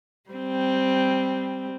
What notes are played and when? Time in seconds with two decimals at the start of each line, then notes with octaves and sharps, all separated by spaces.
0.30 G3 C4